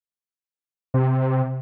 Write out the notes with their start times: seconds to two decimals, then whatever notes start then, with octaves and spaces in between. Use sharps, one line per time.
0.94 C3